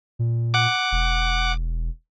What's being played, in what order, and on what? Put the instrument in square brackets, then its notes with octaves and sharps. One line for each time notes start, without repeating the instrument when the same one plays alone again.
[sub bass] A#2
[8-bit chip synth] F#5 D6
[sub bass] E1